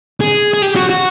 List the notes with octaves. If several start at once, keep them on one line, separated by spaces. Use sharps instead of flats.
G#4
G#4
G4
F#4
F#4